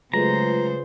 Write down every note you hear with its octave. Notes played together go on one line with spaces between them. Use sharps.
C#3 F#3 G#3 A3 F4 B4 C5 A#5